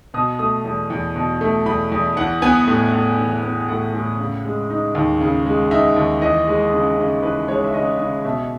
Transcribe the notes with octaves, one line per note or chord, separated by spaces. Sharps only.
B2 D#6
A3 D#6
E2
E2
B2
A3
E2 B5
E2
E3 F#5
B3 G#5
A2
A2
E3
B3
A2 F#5
A2
C#3
G#3
D#4
D#2
C#3
G#3
D#4 E5
D#2
E3 D#5
G#3
C#3
C#3
E3 B4
G#3 C#5
E5
C#3 D#5
C#3
B2 E5